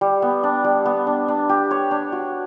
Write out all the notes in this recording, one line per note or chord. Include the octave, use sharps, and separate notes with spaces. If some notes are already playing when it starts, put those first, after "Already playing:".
G3
B3
D4
G3
B3
D4
D4
G4
C#5
D4
F#4